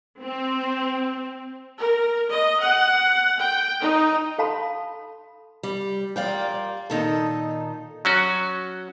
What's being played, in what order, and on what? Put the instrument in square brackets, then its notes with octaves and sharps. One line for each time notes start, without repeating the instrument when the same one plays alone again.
[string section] C4
[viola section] A#4
D#5
F#5
G5
D#4
[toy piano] A4 F5 A5 B5 C6
[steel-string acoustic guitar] G3
[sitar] A#2 G3 A#3 [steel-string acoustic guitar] D5 F5 G5
[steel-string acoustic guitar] A#2 D#3 D#4 [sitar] A4
[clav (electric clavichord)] F#3 C#4 F#4